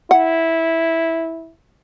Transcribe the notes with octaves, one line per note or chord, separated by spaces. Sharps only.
E4 F#5